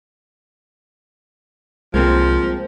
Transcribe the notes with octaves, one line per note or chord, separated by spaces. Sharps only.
C2 F3 G#3 A#3 C4